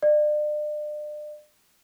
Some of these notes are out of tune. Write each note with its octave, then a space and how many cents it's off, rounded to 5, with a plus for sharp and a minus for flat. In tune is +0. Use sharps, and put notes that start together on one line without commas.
D5 +35